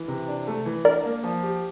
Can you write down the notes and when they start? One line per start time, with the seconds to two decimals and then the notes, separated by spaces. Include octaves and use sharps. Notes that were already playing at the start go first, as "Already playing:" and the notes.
Already playing: E3
0.08 C3
0.28 D4
0.47 A3
0.66 E3
0.85 D4 A#4 D5
1.04 A#3
1.23 F3
1.42 G4